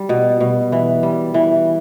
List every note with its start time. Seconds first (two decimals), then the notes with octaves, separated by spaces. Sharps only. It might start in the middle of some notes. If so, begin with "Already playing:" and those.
Already playing: G3
0.09 B2
0.40 B2
0.72 E3
1.03 G3
1.34 E3